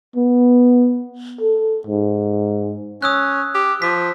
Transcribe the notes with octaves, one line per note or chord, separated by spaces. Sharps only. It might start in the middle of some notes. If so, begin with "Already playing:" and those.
B3
A4
G#2
C#4 D#6 E6 F#6
G4
F3 B6